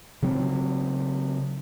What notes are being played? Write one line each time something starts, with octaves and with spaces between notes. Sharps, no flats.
C#3 F#3 C4